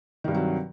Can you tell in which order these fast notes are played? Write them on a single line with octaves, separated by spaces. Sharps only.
D#3 G2 C3 F#3